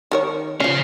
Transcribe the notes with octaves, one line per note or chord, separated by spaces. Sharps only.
D#3 A#4 C#5
C#3 F3 C#4 F5